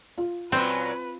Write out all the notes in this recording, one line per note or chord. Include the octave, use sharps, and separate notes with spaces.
F4
A#2 F#3 C4 C#4 B4